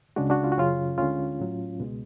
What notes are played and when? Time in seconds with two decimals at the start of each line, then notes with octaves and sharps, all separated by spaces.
0.16 C#2 C#3 G#3 D4 F#4
0.30 D4 F#4
0.44 F4
0.52 F#4
0.57 F#2 C#3 F#3 C#4 F4
0.98 D2 D3 G#3 C#4 F4
1.40 A2 F#3
1.80 C#2 B2 G#3